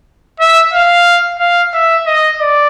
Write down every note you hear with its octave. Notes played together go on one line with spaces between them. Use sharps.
E5
F5
F5
E5
D#5
D5